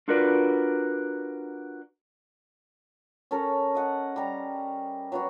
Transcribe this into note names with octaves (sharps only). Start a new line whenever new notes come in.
D4 F4 F#4 A#4 B4 D5
C#4 A4 A#4
D#5 F#5
G3 A#5
F#3 B3 F#4